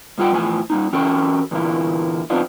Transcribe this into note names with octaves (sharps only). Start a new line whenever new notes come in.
G2 G3 F4 F#5 G5
E2 A2 F3 E4 G#5
G3 A#3 D#4
E3 C#4 F#4 A4 A#4 G5
E2 A#2 D3 A#3 E4
F2 B3 C4 D4 D#4 F4